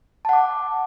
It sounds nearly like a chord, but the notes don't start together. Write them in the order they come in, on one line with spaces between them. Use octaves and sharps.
A5 F#5 D6